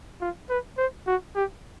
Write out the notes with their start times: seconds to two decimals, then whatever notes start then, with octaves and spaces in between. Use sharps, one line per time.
0.21 F4
0.49 B4
0.78 C5
1.07 F#4
1.35 G4